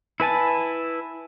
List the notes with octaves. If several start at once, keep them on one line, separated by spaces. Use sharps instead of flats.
E4 B4 G#5 A5